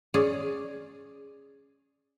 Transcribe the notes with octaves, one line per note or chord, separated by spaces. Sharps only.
C#4 G#4 D5